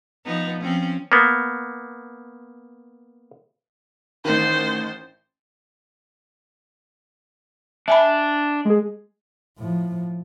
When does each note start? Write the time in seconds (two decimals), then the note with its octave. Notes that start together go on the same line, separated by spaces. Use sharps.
0.25 F3 B3 D#4
0.61 F3 C4 C#4
1.12 A#3 B3
4.25 A1 D#3 C5
7.88 D4 E5 G#5 B5
8.65 G#3 G#4
9.58 A2 F3